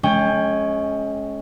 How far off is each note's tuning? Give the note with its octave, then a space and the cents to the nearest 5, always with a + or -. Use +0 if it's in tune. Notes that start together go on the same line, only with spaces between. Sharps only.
G#3 +30 C#4 +0 G5 +20